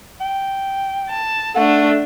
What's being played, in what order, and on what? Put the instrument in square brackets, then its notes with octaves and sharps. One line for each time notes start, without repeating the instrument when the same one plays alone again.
[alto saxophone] G5
[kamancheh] A5
[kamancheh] A3 D4 [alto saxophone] F#5